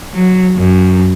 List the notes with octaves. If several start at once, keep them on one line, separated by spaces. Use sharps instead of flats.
F#3
F#2